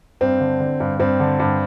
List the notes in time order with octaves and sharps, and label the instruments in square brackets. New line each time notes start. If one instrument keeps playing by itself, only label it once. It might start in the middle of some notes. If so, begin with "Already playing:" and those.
[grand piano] G2 [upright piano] C4
[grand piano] D3
D3
G2
[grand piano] G2 [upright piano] C4
[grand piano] D3
G2